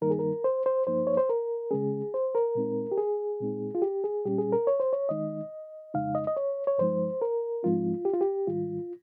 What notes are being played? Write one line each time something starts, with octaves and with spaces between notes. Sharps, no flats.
G2 D#3 G3 A#3 D#4 A#4
G#4
A#4
C5
C5
G2 F3 A#3 D#4 C5
C#5
C5
A#4
C#3 G#3 C#4 G#4
C5
A#4
A#2 G#3 C4 D#4
G4
G#4
A#2 G#3 C4 D#4
F4
G4
G#4
A#2 G3 C#4 G4
G#4
A#4
C#5
C5
C#5
D#3 G#3 D#4 D#5
F2 C#3 G#3 D#4 F5
D#5
D#5
C#5
C#5
G2 F3 G#3 D#4 C5
A#4
G#2 F3 G#3 C4 D#4 F4
G4
F4
G4
G#2 D#3 G3 F4